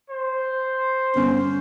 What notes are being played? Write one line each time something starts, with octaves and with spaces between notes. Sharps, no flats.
C5
G2 D3 B3 C#4